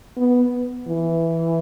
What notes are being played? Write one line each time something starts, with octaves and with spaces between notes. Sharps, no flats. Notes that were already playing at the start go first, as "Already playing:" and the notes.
B3
E3